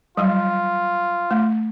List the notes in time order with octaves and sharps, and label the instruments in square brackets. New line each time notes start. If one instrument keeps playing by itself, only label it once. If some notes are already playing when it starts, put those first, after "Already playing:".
[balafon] F#3 G3 [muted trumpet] F4
[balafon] A3